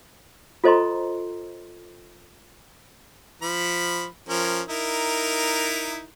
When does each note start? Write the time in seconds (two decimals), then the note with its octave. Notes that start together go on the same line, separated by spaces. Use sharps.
0.64 F4 A4 C5 D#5 A#5 C6
3.42 F3 B5
4.29 F3 C#4 A#4
4.68 D#4 E4 A#4